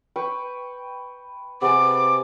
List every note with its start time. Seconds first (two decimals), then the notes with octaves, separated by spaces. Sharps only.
0.16 B4 G5 C#6
1.62 C3 B3 G#4 D6